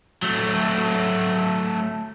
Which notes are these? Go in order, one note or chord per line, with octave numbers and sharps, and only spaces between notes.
F#3 A3